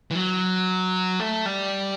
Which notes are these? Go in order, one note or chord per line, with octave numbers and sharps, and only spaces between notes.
E3
F#3
A3
G3